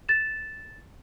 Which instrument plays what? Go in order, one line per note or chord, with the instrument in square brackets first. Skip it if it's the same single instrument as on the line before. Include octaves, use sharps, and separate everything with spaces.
[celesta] A6 E7